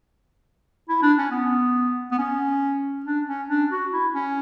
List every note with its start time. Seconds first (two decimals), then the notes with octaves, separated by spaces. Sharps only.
0.89 E4
1.02 D4
1.18 C#4
1.31 B3
2.12 B3
2.19 C#4
3.06 D4
3.27 C#4
3.49 D4
3.70 F#4
3.92 E4
4.15 C#4